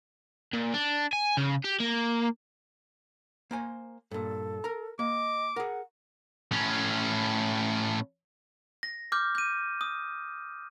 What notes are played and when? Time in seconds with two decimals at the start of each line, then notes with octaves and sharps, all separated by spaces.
0.54 A#2
0.74 D4
1.13 G#5
1.37 C#3
1.65 G4
1.80 A#3
3.51 A#3 C5 G#5
4.11 G2 A#2 A4
4.64 A#4 A#5
4.99 A#3 D#5 D6
5.56 G#4 A#4 F#5
6.52 A2 C#4
8.83 A#6
9.12 D6 F6 G6
9.35 G6 D#7
9.81 D#6